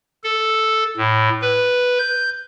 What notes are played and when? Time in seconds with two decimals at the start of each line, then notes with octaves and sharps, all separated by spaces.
0.24 A4
0.97 A2
1.41 B4
1.99 G6